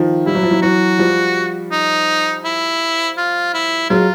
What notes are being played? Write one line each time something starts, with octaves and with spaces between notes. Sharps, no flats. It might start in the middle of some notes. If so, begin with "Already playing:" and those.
Already playing: D#3 F3
G3 E4
F#3
F3
E3 F#3
E3 F#3 F#4
F3 G3
D#4
E4
F4
E4
F#3 G#3 F4